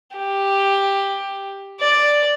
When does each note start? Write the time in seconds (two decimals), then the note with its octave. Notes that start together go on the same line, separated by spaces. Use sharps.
0.16 G4
1.80 D5